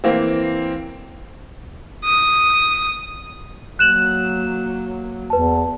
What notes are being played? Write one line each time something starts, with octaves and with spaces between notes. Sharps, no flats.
E3 A#3 C4
D#6
F#3 A#3 F#6 E7 F#7
E2 B4 A5